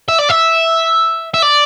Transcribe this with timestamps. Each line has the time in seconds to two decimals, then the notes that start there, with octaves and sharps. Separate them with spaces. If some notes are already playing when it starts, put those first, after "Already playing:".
0.09 E5
0.19 D5
0.30 E5
1.34 E5
1.42 D5